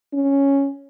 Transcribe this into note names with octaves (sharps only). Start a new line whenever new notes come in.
C#4